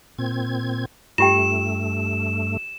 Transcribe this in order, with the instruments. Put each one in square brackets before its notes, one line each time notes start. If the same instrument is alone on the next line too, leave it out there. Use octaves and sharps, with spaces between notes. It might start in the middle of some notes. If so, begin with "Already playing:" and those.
[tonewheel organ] A#2 C4 G#6
[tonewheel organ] G2 A3 [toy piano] F4 G4 G5 [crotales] E7